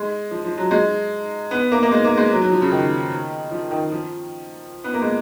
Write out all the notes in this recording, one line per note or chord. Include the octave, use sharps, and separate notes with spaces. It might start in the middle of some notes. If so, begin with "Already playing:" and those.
Already playing: G#3
F3
F3
F#3
G#3
B3
A#3
A#3
G#3
A#3
G#3
F#3
F#3
F3
C#3
D#3
F3
D#3
F3
B3
A#3
G#3